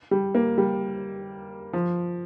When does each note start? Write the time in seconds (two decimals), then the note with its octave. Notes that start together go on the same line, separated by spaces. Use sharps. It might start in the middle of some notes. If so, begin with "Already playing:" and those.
0.11 G3
0.35 A#3
0.58 G3
1.73 F3